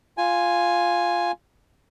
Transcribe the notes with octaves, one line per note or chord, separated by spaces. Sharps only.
F4 G#5